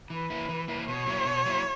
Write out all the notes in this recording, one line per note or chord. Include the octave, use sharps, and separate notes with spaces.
E3 B4
A#3 E4
E3
A#3 E4
B2 C#5
F#3 A#3 E4
B2
F#3 A#3 E4